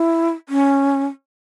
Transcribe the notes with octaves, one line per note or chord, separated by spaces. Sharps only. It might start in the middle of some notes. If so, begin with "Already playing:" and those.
Already playing: E4
C#4